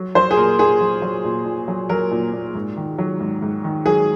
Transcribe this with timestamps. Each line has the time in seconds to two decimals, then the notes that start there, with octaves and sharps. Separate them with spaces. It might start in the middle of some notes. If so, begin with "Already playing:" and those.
Already playing: F#3
0.15 F#3 C5
0.31 G#4
0.37 A#2 A#4
0.59 A#2 G#4
0.81 F#3
1.02 F#3
1.24 A#2
1.46 A#2
1.68 F#3
1.89 F#3 A#4
2.11 A#2
2.33 A#2
2.55 G#2
2.77 D#3
2.98 F#3
3.20 G#2
3.42 G#2
3.64 D#3
3.86 F#3 G#4